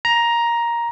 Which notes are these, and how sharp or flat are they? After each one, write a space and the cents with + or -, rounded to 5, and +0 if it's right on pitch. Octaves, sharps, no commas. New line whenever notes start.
A#5 +10